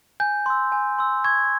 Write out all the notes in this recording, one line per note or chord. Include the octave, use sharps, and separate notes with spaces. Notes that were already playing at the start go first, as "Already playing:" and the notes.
G#5 G6
C6 E6
G#5
C6 E6
C#6 G#6